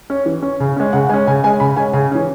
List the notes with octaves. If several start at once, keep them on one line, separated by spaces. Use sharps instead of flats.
C#4
E3
C#4
C#3
G#3 C#4
C#3 F#5
G#3 C#4 G#5
C#3 G#5
G#3 C#4 G#5
C#3 B5
G#3 C#4 G#5
C#3 G#5
E3 C#4